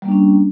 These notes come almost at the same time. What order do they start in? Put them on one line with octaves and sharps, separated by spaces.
G3 A#3 D4 C#4